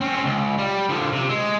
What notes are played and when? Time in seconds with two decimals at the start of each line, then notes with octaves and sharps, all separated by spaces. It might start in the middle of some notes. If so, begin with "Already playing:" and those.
0.01 C4 C#4
0.25 C#2
0.58 G3
0.89 D3 F3
1.12 C3
1.29 G#3